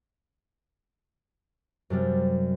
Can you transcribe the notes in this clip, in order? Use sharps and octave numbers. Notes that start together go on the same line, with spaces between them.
F#2 C3 G3